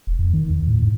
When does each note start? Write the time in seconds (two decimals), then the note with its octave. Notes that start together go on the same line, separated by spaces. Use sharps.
0.07 E1
0.19 F2
0.34 D#3
0.49 E2
0.67 A2
0.82 G#2